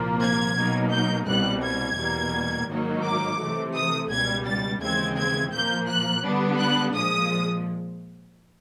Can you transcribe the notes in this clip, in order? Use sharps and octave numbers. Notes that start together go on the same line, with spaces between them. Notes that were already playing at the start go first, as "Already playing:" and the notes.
Already playing: C2 A#2 F3 A#3
G#6
B2 F#3 A#3 D#4
G6
C2 B2 G3 F#6
G#6
E2 B2 G3 A#3
G#2 D#3 F#3 A#3 D#4
D6
C3 E3 A3
D#6
C#2 B2 G3 G#6
A6
D#2 C#3 E3 G#3 C4 G#6
G#6
A#2 F3 A#3 G6
F#6
D3 G3 B3 D4
F#6
A#2 F3 G#3 D#6